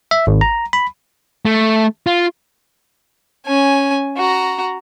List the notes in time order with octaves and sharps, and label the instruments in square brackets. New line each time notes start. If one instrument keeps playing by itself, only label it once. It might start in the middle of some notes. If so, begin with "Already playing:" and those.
[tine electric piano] E5
G#1
A#5
B5
[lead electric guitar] A3
F4
[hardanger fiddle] C#4 G#5
F#4 A#5